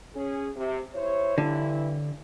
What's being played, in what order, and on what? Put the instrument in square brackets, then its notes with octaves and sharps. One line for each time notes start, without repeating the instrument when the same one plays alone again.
[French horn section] C#4 G#4
C3
E4 C5 C#5
[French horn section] G2 E3 E4 [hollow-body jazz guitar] D3